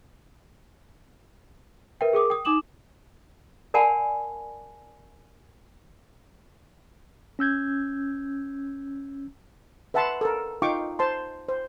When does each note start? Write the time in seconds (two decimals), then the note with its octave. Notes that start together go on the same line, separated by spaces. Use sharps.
2.01 A#4 B4 E5 G5
2.13 G#4 A#4 D6 D#6
2.30 G5 D#6
2.45 D#4 D6 D#6 E7 F#7
3.74 A#4 D5 F#5 G#5 A5 B5
7.39 C#4 E6 G6 G#6
9.94 B4 E5 F#5 A5 B5 C6
10.21 A4 A#4
10.62 D#4 F4 F5 G5 C#6 D6
10.99 C5 A5 C6
11.49 C5